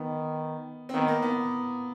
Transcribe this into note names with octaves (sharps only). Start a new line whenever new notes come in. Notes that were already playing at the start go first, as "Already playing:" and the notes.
Already playing: D#3 B3
C4
D#3 B3
A#3
B3